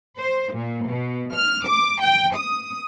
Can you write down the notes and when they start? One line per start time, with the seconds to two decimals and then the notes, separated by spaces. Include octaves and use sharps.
0.19 C5
0.55 A#2
0.89 B2
1.35 F6
1.66 D6
2.02 G5
2.36 D#6